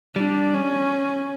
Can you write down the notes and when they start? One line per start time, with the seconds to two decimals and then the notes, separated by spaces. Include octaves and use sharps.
0.16 G3 D4
0.54 C#4